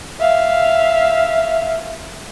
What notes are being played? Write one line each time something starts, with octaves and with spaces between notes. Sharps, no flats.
E5 F5